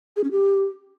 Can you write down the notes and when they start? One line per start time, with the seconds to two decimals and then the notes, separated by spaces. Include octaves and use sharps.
0.16 G#4
0.24 C#4
0.31 G4